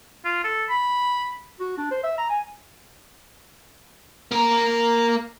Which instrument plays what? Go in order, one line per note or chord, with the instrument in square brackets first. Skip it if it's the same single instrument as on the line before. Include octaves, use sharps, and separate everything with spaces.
[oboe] F4
A4
B5
[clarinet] F#4
D4
C5
E5
A#5
G#5
[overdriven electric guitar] A#3 A#4